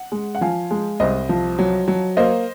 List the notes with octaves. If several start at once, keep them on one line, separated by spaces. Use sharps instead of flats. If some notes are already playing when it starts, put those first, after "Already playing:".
Already playing: F#5
G#3
F#5
F3 F5 G#5
G#3
C2 C5 D#5
F3
F#3
F#3
A#3 C5 D#5